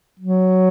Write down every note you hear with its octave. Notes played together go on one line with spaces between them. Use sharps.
F#3